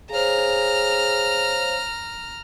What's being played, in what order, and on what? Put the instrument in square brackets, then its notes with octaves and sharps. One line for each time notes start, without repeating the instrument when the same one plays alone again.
[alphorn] G#4 [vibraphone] C5 C#5 F5 [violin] A#5 F6